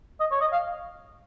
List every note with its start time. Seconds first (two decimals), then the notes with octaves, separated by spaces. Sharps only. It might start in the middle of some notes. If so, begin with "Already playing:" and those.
0.20 D#5
0.31 C#5
0.41 D#5
0.52 F5